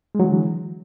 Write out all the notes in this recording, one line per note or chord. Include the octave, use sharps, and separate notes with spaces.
D3 E3 F#3 G#3